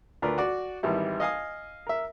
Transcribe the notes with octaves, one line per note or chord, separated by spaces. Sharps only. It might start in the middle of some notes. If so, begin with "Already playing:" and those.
D2 F4 A#4 B4 D5
F#4 D5
G#1 E3 G3 E4
D#5 F5 G#5 D#6
A#4 E5